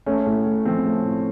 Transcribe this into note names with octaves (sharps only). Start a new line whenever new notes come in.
A3 C#4
A2
A2
F3 C4
A3
A2